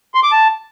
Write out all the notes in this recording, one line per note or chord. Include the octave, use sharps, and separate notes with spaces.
C6
D6
A5